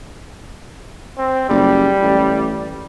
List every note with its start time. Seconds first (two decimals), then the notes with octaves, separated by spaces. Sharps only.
1.18 C4
1.49 F#1 G3
2.02 A1